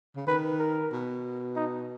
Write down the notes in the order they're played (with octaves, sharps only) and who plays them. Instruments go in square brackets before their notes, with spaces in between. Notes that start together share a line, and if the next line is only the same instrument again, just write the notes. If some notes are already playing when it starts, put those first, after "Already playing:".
[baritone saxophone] C#3
[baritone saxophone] D#3 [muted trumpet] B4
[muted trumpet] A#4
[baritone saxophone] B2
[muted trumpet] D#4